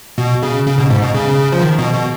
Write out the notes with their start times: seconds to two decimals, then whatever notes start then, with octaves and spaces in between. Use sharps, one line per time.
0.18 B2
0.43 C#3
0.66 C#3
0.78 B2
0.90 G#2
1.02 B2
1.15 C#3
1.52 F3
1.62 D#3
1.78 B2
1.94 B2